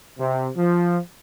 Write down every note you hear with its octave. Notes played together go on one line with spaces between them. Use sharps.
C3
F3